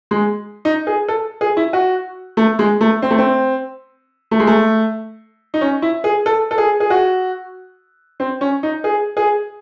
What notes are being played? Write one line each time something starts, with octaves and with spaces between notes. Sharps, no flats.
G#3
D#4
G#4
A4
G#4
E4
F#4
A3
G#3
A3
C4
A3
C4
A3
G#3
A3
D#4
C#4
E4
G#4
A4
A4
G#4
G#4
F#4
C4
C#4
D#4
G#4
G#4